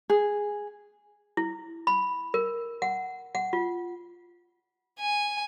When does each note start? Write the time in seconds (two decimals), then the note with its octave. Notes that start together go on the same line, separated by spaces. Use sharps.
0.10 G#4
1.37 E4
1.87 B5
2.34 A#4
2.82 F#5
3.35 F#5
3.53 F4
5.00 G#5